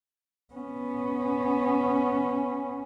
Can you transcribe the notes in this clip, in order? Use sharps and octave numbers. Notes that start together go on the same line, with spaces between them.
B3 C#4